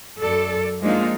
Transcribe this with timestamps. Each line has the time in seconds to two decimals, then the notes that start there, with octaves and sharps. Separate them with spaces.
0.19 F#2 A4 D5
0.81 F3 G#3 A#3 D4 D#4 F4